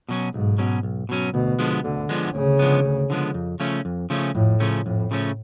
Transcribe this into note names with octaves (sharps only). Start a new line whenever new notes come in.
B2 F#3 C#4
B1 G#2
B2 F#3 C#4
B1
B2 F#3 C#4
D2 B2
D3 F3 G#3 B3
D2 D3
D3 F3 G#3 B3
D2 C#3
D3 F3 G#3 B3
D2
D3 F3 G#3 B3
F2
C#3 F3 A3 C#4
F2
C#3 F3 A3 C#4
F2 A2
C#3 F3 A3 C#4
F2 A2
C#3 F3 A3 C#4